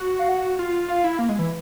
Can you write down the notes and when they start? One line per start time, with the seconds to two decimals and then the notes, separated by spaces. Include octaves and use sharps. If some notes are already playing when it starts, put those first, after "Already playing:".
Already playing: F#4
0.19 F5
0.29 F#5
0.59 F4
0.88 F4 F5
1.04 E4
1.19 A#3
1.29 G#3
1.39 E3